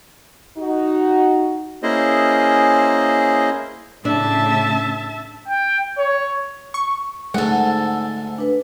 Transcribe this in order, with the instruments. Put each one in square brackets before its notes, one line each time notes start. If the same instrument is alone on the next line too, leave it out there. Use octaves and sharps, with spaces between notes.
[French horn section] D#4 F#4
[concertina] A#3 C#4 E4 G#4 C5 D#5
[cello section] A2 C#3 [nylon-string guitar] D4 [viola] E5 A5
[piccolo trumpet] G5
C#5
[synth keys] C#6
[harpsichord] D2 G#2 [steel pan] G#3 [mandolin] A4 F#5
[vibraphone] D4 B4